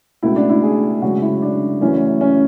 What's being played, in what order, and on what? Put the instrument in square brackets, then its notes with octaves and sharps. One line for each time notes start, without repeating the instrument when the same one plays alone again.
[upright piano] C#2 B2 A3 E4
D4
E4
G#4
F#2 C#3 G#3 F#4
E4
D4
F#2 E3 A3 C#4
C#4